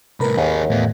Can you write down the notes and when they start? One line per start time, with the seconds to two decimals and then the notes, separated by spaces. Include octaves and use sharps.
0.20 C2 A2 A#4 B4 B5
0.37 D#2 D#3 G#4
0.70 E2 A2 B3